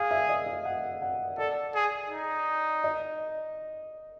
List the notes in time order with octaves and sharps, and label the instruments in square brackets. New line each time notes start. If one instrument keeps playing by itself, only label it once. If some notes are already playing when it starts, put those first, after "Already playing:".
Already playing: [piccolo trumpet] G#4 [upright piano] F5
[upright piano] E5
D#5
F5
F#5
F#5
[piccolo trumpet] A4 [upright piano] D5
[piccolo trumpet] G#4
D#4
[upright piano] D#5